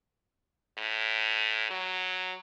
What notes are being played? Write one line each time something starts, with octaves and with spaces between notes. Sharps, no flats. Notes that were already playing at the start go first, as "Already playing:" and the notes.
A2
F#3